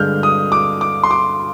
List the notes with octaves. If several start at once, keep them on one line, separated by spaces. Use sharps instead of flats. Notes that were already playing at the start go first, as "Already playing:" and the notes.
Already playing: G2 D3 G#3 D4 F6 G6
D#6
D6
D6
C6
D6